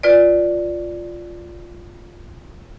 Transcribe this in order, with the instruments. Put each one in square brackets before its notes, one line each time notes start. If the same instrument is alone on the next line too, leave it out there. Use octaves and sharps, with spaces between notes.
[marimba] F4 B4 D5